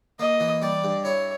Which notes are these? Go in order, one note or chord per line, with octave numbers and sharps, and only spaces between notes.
A#3 D#5
E3
G3 D5
G2
E4 C#5